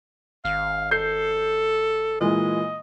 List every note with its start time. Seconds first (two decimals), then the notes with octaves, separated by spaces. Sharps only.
0.45 G#1 F5
0.91 A4 G6 C7
2.21 A#2 E3 G#3 D#5